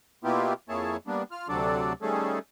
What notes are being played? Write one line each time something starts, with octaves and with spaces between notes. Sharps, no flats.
B2 A#3 B3 E4 F4 G4
F2 A#3 E4 G#4 C#5 A5
G3 A#3 B3 D4
F4 F6
D2 C3 F#3 D4 A4 D5
D#3 G3 A3 C#4 G#4 A4